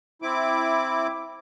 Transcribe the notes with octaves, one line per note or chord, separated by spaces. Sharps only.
C4 E4 D6